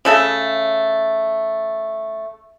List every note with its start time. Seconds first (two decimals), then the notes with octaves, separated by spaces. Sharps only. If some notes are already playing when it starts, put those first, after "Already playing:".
0.05 C#3 A3 A4